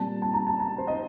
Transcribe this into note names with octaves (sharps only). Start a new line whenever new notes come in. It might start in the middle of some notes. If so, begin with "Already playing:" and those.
Already playing: A#2 G3 C4 A5
A5
A#5
A5
A5
C5
D#5